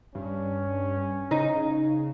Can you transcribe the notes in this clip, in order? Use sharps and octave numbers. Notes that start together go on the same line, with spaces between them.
G2 C#4
C#3 D#4